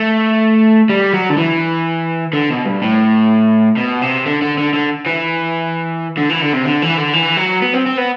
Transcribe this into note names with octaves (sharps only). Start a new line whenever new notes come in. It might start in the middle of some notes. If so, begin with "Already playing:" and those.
Already playing: A3
G3
F#3
D3
E3
D3
B2
G2
A2
B2
C3
D3
D3
D3
D3
E3
D3
E3
D3
C3
D3
E3
D3
E3
F#3
B3
C4
C4
B3